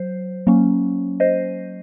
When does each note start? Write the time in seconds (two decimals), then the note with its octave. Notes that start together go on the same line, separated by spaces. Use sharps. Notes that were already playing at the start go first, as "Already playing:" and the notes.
Already playing: F#3 C5
0.47 F#3 A#3 C#4
1.20 C5 D#5